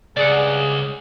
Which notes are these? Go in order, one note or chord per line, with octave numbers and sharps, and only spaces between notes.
C#2 G2 G#4 D5 F#5